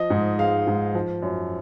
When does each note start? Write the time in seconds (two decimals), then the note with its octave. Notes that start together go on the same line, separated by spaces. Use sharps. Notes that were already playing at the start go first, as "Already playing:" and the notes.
Already playing: F3 D#5
0.10 G#2
0.38 G#3 F5
0.67 G#2
0.95 F3
1.22 F#2